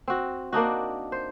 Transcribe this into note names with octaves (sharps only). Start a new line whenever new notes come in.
C4 F#4
A#3 D4 D#4 F#4
C5